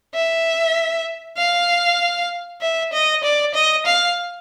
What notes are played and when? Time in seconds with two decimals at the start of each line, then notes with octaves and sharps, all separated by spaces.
0.15 E5
1.37 F5
2.61 E5
2.93 D#5
3.23 D5
3.54 D#5
3.86 F5